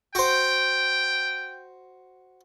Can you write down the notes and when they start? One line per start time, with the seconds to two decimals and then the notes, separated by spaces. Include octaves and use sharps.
0.15 F#4 C5 G5